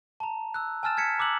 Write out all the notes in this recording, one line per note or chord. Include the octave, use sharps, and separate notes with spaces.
A5 A#5
E6 F#6
G#5 A5 E6 F6 A6 E7
F6 G#6 B6 C#7 E7
A#5 D6 E6 F#6 F#7